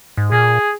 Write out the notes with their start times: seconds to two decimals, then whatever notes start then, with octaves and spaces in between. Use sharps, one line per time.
0.17 G#2
0.32 A#2 G#4